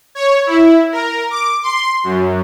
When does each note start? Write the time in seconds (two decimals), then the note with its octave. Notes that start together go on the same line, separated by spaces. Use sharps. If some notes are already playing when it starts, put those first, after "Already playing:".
0.15 C#5
0.47 E4
0.92 A#4
1.30 D6
1.63 C6
2.04 F#2